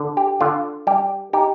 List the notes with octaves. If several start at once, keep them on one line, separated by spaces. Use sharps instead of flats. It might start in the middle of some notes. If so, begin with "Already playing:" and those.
Already playing: D3
G4
D3 F4
G3 G4
D#4 G4